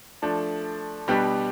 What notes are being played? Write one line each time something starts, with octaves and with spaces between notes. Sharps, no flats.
F3 A3 D4
B2 G3 B3 D4 G4